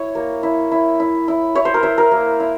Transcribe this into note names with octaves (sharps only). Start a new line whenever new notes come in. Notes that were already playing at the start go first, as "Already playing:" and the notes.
Already playing: E4 C#5
A#3
E4
E4
E4
E4
E4 C#5
C5
A#4
E4 C5
A#4
A#3
E4